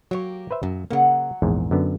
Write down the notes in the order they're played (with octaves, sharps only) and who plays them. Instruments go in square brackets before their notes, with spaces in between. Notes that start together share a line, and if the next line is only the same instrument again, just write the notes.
[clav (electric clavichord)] F#3 C#5 [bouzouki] A#3 G4
[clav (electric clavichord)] B4 C5 E5
[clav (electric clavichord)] F#2 [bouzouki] A#2
[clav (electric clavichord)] C#3 A#3 [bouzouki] F#3 F#5
[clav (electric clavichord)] A#1 E2 G#2
F#2 D3 B3